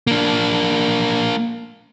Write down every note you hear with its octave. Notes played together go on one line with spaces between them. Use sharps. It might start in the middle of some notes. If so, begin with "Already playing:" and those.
A#3 D4